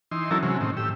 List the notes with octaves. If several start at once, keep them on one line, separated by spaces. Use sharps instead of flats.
E3 D#4 C6
E3 F#3 C#4 E4 A4 A#4
C3 F#3 G#3 C#4
A2 D#3 C4
A2 G4 E6